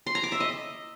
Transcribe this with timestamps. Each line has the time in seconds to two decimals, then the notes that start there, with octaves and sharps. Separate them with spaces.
0.06 C6
0.15 A#5
0.23 D6
0.32 E5
0.40 D#5